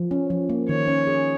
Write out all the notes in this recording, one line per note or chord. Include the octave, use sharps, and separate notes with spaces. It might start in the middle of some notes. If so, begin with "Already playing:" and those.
Already playing: F3
C#4
F3
A#3
D#3 C#5
C#4
G#4